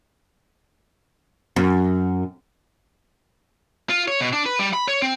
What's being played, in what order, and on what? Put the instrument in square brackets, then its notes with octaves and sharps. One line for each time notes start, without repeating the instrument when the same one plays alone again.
[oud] F#2
[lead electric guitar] F4
C#5
B2
D4
B4
G3
B5
C#5
C4